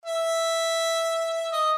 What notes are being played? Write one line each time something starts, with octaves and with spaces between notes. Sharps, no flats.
E5
D#5